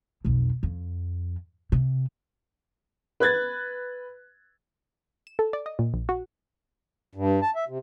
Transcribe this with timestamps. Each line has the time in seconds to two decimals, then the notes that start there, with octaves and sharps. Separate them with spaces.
0.25 B1 F2
0.63 F2
1.72 C3
3.20 B4 F#6 G#6 A6
5.27 E7
5.39 A4
5.53 D5
5.66 D#5
5.79 A#2
5.94 A#1
6.09 F#4
7.15 G2
7.42 A5
7.56 E5
7.69 C3